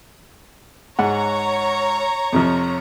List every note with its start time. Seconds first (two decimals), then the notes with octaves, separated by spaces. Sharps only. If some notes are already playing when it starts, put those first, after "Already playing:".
0.99 G#2 C#5 F#5 A#5
2.33 F2 C3 F3